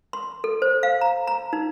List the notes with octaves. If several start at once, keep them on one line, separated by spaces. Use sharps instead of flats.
C6
A4
C5
F5
A#5
A#5
D#4